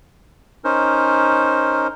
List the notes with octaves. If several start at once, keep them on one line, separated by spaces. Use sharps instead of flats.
C#4 D#4 A#4 C5